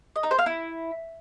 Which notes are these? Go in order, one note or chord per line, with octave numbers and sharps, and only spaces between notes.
D#5
D#4
C5
F5
E4